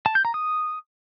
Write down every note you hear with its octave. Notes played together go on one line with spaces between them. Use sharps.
A5
G6
A#5
D#6